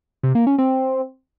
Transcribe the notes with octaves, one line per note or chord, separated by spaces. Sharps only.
C3
A#3
C#4
C4